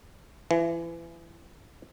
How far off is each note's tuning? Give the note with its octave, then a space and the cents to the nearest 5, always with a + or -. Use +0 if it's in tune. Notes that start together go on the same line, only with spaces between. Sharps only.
E3 +30